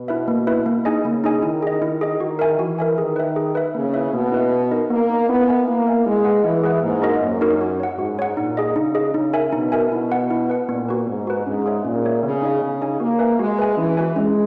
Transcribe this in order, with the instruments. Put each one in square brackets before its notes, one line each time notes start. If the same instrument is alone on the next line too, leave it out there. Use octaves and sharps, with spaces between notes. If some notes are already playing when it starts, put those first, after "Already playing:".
Already playing: [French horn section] B2
[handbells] E4 B4 E5
A#3
E4 B4 E5
A#3
D#4 G#4 D#5 G#5
[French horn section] C#3 [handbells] A#3
[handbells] D#4 G#4 D#5 G#5
[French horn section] D#3 [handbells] E4
[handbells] G#4 D#5
[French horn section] D#3 [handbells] E4
[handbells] G#4 D#5
[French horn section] D#3 [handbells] F#4
[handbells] A#4 E5 G#5
[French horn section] E3 [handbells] F#4
[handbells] A#4 E5 G#5
[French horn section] D#3 [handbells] G#4
[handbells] B4 E5
G#4
B4 E5
[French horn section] C#3 [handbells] A#3
[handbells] E4 B4 E5
[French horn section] B2 [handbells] A#3
[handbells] E4 B4 E5
B3
D#4 A#4 D#5
[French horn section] A#3 [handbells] B3
[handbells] D#4 A#4 D#5
[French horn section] B3 [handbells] E4
[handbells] A#4 E5 G#5
[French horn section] A#3 [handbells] E4
[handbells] A#4 E5 G#5
[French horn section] G#3 [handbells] E4
[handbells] G#4 B4 F#5
[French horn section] E3 [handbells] E4
[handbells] G#4 B4 F#5
[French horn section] G#2 [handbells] A#3
[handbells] D#4 F#4 A#4 D#5
[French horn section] F#2 [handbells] A#3
[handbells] D#4 F#4 A#4 D#5
F#4
C#5 F#5
[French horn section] G#2 [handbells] F#4
[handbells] C#5 F#5
[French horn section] A#2 [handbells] D#4
[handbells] G#4 D#5
[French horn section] C#3 [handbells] D#4
[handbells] G#4 D#5
[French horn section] C#3 [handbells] D#4
[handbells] A#4 E5 G#5
[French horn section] B2 [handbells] D#4
[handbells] A#4 E5 G#5
[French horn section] B2 [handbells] E4
[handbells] B4 F#5
E4
B4 F#5
[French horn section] A#2 [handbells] B3
[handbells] F#4 B4
[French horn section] G#2 [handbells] B3
[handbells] F#4 B4
[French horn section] G#2 [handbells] C#4
[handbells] G#4 C#5 E5
[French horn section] A#2 [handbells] C#4
[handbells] G#4 C#5 E5
[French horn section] C#3 [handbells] B3
[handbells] D#4 G#4 D#5 G#5
[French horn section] C#3 [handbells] B3
[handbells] D#4 G#4 D#5 G#5
[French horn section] A#3 [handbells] F#4
[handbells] B4 E5 G#5
[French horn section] G#3 [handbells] F#4
[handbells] B4 E5 G#5
[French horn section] E3 [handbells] C#4
[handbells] F#4 B4 E5 G#5
[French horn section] G#3 [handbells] C#4